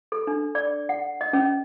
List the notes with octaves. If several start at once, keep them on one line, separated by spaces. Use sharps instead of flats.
A4
D4
D5
F#5
D#5
C#4